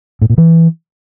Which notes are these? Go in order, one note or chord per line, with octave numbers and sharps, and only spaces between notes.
A2
A#2
E3